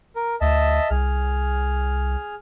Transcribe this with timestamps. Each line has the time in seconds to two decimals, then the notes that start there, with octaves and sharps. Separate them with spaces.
0.16 A#4
0.41 D2 D#5 E5 A5
0.90 C2 G#4 F6